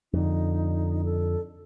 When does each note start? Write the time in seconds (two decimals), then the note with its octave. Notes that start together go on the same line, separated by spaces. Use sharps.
0.13 F2 D3 D#4
1.05 A4